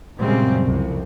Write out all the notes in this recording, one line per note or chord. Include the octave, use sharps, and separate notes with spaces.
F#2 A#2 C#3 G3 G#3 C4
C2 F2